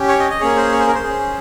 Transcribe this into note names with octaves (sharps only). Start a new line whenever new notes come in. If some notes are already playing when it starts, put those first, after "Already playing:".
Already playing: C#4 G4
C#5
D#5
D#5
A#3 C#4 G#4 C#5
C5
C#5
C5
A#4
C5
C#4 G#4